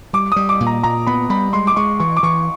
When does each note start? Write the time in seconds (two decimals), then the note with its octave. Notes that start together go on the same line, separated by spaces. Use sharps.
0.13 G3 D6
0.32 G3 D#6
0.49 D6
0.60 A#2
0.67 A#5
0.83 A#2 A#5
1.07 B3 B5
1.30 G3 B5
1.53 G#3 C6
1.67 D6
1.76 G#3 C#6
2.00 E3 C#6
2.17 D6
2.23 E3 C#6